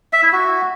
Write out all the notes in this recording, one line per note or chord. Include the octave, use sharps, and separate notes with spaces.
E5
E4
F#4